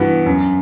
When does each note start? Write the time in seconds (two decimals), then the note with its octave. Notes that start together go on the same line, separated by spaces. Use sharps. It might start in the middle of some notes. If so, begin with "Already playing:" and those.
Already playing: G2 E3 B3 F#4
0.26 F#2